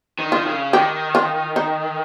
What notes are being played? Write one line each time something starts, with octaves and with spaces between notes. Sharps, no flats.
D#3
D#3 F4
C#3
D#3 G4
F4
D#4